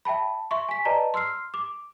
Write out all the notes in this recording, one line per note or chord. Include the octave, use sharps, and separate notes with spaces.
E5 G5 A5 B5
E5 C6 C#6
G#5 B6
B4 D5 D#5 A5 A#5
C6 E6 F6 C7
D6